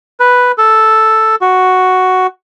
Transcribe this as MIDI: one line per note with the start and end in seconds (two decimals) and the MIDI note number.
0.20 0.52 71
0.58 1.35 69
1.41 2.27 66